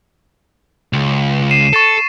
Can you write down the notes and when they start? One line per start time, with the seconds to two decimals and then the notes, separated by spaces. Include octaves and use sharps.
0.93 C#2
1.51 C7 D#7 E7
1.73 A4 C#6 A6 E7